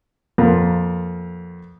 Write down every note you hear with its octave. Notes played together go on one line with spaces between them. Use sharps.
F2 A#2 B3 F4 A#4 A#5